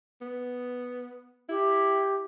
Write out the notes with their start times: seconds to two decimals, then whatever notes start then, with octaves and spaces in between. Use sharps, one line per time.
0.21 B3
1.49 E4 G4